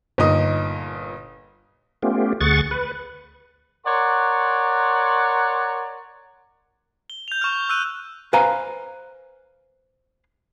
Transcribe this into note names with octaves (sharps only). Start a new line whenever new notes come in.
G1 A#2 D#4 D#5 D#6
A3 B3 C#4 F4 G4
D2 G#4 F#5 C#6 A6
B4
A#4 C#5 D5 F#5 A#5 C6
G7
G6 F7
C#6 F6
E6 F#6 D#7
B4 C5 F5 G#5 A#5